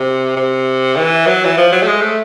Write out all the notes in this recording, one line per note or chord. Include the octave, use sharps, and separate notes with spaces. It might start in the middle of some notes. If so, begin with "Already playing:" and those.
Already playing: C3
C3
E3
F#3
E3
F3
F#3
A3
G#3
A3